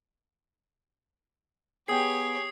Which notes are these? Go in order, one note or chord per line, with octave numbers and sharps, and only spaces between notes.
B3 G4 G#4 C#5 G5 D#6 G#6 C7